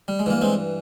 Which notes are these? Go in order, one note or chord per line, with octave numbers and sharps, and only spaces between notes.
G3
G#3
G2 E3 A#3
G#3 C4